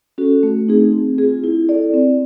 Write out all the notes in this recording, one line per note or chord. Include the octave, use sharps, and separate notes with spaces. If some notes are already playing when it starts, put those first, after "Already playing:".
C#4 F#4 A4
A3
C4 D#4 G#4
C4
F4 G#4
E4
A4 D5
C4